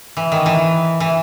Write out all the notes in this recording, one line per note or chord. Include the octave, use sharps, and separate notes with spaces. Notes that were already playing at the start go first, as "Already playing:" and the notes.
E3
D#3
E3
E3